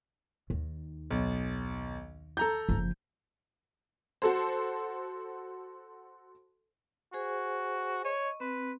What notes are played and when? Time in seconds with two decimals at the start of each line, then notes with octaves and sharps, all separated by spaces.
0.50 D#2 D#3
1.10 B1
2.37 A4 A#5 G6
2.69 F#1 F3
4.22 F#4 A4 C5
7.14 F#4 G#4 C5 G#5
8.05 C#5 D#5 C#6
8.40 C4 B4